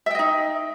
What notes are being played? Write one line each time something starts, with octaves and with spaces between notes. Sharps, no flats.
D#4 D#5 E5 G5